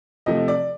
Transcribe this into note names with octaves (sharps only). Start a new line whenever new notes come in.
C3 F3 A3 D#5
D5